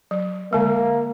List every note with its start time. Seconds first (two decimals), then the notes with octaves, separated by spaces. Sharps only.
0.11 F#3
0.53 D3 G#3 A#3